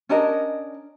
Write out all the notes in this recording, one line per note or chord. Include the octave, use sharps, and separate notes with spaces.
C#4 D4 A#4 D#5